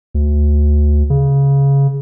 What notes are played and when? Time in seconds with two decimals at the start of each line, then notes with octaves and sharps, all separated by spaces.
0.15 D2
1.10 C#3